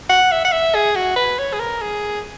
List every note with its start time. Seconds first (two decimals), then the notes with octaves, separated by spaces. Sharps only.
0.09 F#5
0.31 E5
0.45 F#5
0.52 E5
0.74 G#4
0.96 F#4
1.16 B4
1.39 C#5
1.53 G#4
1.59 A#4
1.81 G#4